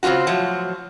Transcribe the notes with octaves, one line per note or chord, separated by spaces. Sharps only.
C#3 C4 C#4 F4 F#4
A2 F3 F#3